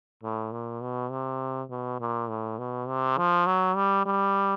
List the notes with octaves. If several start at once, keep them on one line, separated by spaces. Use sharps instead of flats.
A2
A#2
B2
C3
B2
A#2
A2
B2
C3
F3
F#3
G3
G3